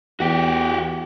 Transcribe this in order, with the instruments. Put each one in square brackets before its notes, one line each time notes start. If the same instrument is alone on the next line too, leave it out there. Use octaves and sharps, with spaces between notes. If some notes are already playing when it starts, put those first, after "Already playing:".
[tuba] E2 [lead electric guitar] F#4 G4